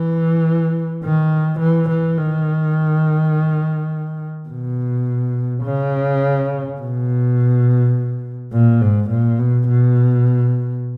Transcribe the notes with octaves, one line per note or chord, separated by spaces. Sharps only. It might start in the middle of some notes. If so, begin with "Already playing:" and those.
Already playing: E3
D#3
E3
E3
D#3
B2
C#3
B2
A#2
G#2
A#2
B2
B2